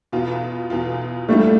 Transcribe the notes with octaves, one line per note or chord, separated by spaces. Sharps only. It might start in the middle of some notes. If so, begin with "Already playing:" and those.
E2 B2 B3 F4
E2 B2 B3 F4
A2 G3 A3 D4 F4